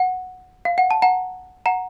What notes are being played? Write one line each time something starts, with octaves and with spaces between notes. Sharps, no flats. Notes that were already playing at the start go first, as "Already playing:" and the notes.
Already playing: F#5
F5
F#5
A5
F#5 A#5
F#5 A#5